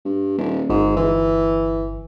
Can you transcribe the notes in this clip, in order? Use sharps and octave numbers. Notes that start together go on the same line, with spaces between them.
G2
D#1
G1 G#2
E3